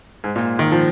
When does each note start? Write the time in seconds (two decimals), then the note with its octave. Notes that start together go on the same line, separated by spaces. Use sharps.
0.24 G#2
0.36 A#2
0.59 D#3
0.72 F3